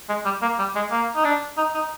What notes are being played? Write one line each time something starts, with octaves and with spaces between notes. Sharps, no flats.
G#3
G3
A#3
G3
G#3
A#3
D#4
D4
D#4
D#4